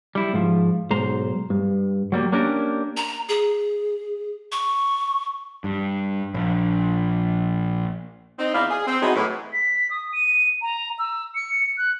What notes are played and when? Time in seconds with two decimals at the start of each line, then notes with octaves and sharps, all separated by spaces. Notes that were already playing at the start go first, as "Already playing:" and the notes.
0.15 G3 E4
0.33 G#2 F3
0.90 B1 G#2 C5 A#5
1.50 G2
2.12 F#3 G3 A#3
2.32 A#3 C#4 D4 G4 A#4
2.97 A#5
3.29 G#4
4.52 C#6
5.64 G2
6.34 A#1
8.39 C4 D#4
8.55 E2 D#4 E4 D5 D#5 F5
8.70 G#4
8.87 C4
9.03 F#3 B3 D#4 E4 F#4 G#4
9.16 A2 E3
9.53 B6
9.90 D#6
10.13 D#7
10.62 A#5
10.99 E6
11.35 C#7
11.78 F#6